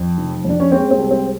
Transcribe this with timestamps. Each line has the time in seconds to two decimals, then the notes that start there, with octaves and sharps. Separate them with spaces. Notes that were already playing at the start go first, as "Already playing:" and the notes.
Already playing: F2
0.18 F1
0.45 F2 D4
0.60 C#4
0.71 G#3 C4
0.91 C4
0.98 C2
1.11 C4